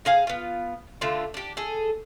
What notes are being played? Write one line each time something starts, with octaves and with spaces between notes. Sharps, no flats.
D#4 G#4 F5 G#5
B3 F4
D3 A3 F4
D4 G4
G#4 A4